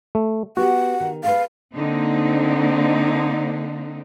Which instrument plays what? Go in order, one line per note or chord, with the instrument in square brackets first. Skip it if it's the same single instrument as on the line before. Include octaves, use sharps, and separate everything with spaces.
[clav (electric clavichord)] A3
[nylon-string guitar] B3 G4 [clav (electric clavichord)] F#4 [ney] F#5
[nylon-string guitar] D#3
[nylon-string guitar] G#4 A4 B4 [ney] F5
[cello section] D3 A#3 C4 D#4